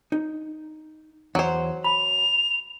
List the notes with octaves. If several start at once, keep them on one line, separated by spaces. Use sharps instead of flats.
D#4
E2 F#3 C5 C#5
B5 F7